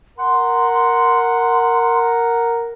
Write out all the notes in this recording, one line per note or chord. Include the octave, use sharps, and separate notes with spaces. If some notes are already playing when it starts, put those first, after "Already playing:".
A#4 F#5 C6